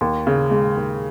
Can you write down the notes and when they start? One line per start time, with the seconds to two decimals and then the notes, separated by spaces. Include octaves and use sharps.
0.01 D#2
0.27 C#3
0.51 G#3
0.77 D#2